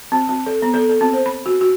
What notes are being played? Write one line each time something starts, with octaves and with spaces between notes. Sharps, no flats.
C4
C4
A4
B3
A4
A4
C4
C5
B5
F#4
F#4